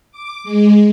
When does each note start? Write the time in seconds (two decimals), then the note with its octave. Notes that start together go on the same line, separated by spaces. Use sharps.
0.11 D6
0.44 G#3